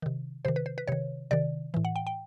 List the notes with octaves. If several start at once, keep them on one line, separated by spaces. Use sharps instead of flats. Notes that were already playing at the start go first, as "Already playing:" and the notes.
C3 D#3
C3 D#3 C5
B4
C5
B4
C3 D#3 C#5
C3 D#3 D5
A2 E3
F#5
G5
G5